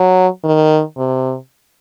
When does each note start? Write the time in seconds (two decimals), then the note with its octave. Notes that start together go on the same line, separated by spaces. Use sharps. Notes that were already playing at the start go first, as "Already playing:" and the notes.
Already playing: F#3
0.44 D#3
0.97 C3